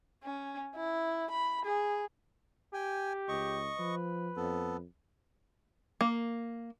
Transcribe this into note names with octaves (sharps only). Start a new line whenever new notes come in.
C#4
E4
B5
G#4
G4 G5 G#5
C#2 D#5 C#6
F3 B4
F2 B3 A4
A#3